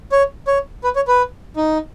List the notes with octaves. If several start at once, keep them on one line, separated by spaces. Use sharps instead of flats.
C#5
C#5
B4
C#5
B4
D#4